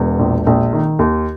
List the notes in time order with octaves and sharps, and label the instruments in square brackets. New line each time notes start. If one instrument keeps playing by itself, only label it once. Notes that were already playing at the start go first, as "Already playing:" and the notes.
Already playing: [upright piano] E1 E2
A#1
A#1
D#3
D#2